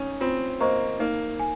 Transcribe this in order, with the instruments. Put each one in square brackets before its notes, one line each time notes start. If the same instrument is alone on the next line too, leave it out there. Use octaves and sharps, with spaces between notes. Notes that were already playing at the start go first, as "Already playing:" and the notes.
Already playing: [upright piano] C#4 D#4
[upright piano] C4 [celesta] F4
[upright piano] A#3 [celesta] C5 D#5 A#5 C#6
[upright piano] A#3 [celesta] D#4
[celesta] G#5